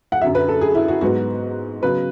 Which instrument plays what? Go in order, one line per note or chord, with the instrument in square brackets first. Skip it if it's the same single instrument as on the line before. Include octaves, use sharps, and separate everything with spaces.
[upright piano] F#5
F#2 D3 F#3 E5
B4
A4
G#4
E4
F#4
G#2 F#3 B3 F#4
C#3 F#3 B3 B4